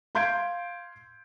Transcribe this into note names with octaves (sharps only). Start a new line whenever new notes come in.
F5 C6 G6 G#6 D7